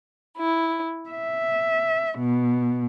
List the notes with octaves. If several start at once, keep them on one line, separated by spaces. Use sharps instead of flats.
E4
E5
B2